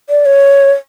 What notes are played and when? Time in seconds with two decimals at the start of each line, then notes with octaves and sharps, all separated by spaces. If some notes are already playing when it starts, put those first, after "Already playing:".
0.10 D5
0.26 C#5